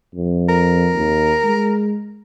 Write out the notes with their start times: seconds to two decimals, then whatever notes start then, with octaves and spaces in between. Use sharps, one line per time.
0.15 F2
0.49 A#4
0.95 D#2
1.44 G#3